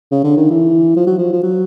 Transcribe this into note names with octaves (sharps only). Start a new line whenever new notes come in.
C#3
D3
D#3
E3
F3
F#3
F3
F3
F#3